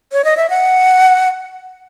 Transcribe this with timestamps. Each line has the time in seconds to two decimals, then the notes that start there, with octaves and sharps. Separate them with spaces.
0.12 C#5
0.25 D#5
0.37 E5
0.50 F#5